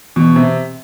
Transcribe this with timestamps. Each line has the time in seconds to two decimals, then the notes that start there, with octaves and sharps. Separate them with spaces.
0.16 B2 E3
0.36 C3 C4